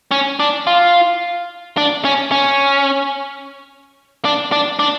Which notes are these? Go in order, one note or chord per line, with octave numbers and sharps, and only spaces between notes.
C#4
D4
F4
D4
C#4
C#4
D4
D4
D4